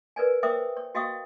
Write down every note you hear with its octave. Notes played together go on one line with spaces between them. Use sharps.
A#4 B4 D5 G#5
A#4 C5 E5 G5 D6 D#6
C#5
F#4 D#5 F5 G5 C#6 D#6